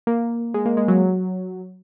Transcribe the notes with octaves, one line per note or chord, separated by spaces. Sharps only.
A#3
G#3
A#3
G#3
F#3